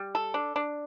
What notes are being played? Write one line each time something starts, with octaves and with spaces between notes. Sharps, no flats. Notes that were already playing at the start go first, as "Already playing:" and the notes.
Already playing: G3
A4
D4
D4